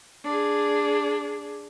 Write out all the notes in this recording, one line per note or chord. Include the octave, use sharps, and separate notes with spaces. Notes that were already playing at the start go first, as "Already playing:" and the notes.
D4 G#4